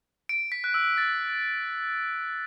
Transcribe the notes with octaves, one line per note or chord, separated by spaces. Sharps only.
D7
B6
F#6
E6
A6